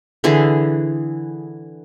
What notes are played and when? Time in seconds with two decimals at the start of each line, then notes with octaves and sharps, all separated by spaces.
0.24 D3 E3 G#4